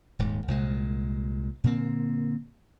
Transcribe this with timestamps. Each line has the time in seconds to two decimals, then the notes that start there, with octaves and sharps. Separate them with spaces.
0.19 D#1 G#2
0.48 C2 A#2 G#3
1.64 A#2 D3 A#3 C4